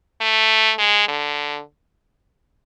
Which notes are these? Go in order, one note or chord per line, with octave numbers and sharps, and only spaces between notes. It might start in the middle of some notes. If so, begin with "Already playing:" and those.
A3
G#3
D3